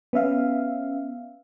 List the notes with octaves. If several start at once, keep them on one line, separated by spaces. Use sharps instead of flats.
B3 C#4 E5 F5